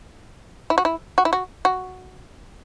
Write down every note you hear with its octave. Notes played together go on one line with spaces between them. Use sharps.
E4
F#4
E4
F#4
E4
F#4
F#4